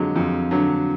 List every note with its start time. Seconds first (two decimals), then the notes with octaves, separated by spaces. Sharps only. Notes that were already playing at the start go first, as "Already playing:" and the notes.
Already playing: F2 D3 F#3 G#3
0.15 F2
0.51 D3 F#3